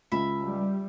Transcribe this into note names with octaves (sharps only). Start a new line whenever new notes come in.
C#2 E5 B5
G3